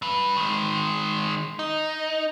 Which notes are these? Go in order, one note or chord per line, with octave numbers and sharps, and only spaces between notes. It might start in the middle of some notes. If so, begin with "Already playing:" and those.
G2 B4
D#3 G#3
D#4